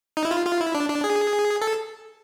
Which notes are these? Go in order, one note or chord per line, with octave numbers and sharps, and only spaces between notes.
D#4
E4
F4
F4
E4
D4
D4
G#4
A4